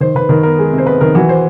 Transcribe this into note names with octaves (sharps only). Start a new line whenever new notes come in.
D#3 C5
D#3 B4
D#3 A#4
B3 A#4
G#3
C3
C5
B3 B4
D#3 A#4
E3 F#4
C5